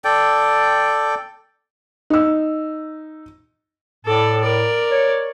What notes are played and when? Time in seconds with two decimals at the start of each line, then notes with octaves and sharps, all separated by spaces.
0.04 A4 D5 G5
2.10 D#4 E6
4.05 A2 A4 D5
4.40 A#4 D5
4.91 C#5